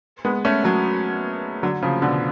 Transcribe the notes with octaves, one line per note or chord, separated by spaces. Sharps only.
G#3 B3
A3 C#4
F#3 A3
D3 F#3
C#3 F3
B2 D3